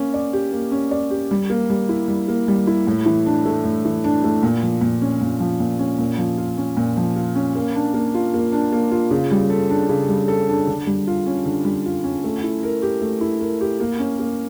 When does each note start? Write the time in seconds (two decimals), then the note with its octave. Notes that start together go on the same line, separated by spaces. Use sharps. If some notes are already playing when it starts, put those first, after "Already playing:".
Already playing: A#3 C#4
0.14 D5
0.33 G4
0.52 A#3
0.71 C#4
0.91 D5
1.10 G4
1.31 G3
1.50 A#3
1.70 G3
1.89 E4
2.08 G3
2.28 A#3
2.48 G3
2.67 E4
2.87 A2
3.06 E3
3.26 D4
3.45 A3
3.64 A2
3.85 E3
4.04 D4
4.24 A3
4.43 A#2
4.63 F3
4.81 A#2
5.01 C#4
5.21 A#2
5.40 F3
5.60 A#2
5.79 C#4
5.98 A#2
6.18 F3
6.37 F4
6.57 C#4
6.77 A#2
6.97 F3
7.16 F4
7.35 C#4
7.55 A#3
7.75 D4
7.94 A#3
8.14 F4
8.34 A#3
8.52 D4
8.72 A#3
8.91 F4
9.11 C#3
9.31 G3
9.50 A4
9.70 D4
9.89 C#3
10.08 G3
10.28 A4
10.49 D4
10.67 D3
10.87 G3
11.07 F4
11.26 C#4
11.45 D3
11.65 G3
11.85 F4
12.04 C#4
12.24 A3
12.43 E4
12.63 A#4
12.82 G4
13.01 A3
13.21 E4
13.40 A#4
13.61 G4
13.80 A#3
13.99 C#4
14.19 A#3